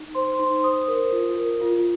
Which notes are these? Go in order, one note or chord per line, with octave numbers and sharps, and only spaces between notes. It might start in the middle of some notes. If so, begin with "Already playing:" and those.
Already playing: D#4
C5 C6
D#4 C6
C5 D#6
A#4
F4
A#4
F4